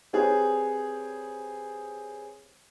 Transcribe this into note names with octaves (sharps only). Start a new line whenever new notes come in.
C4 G4 G#4 B4 C#5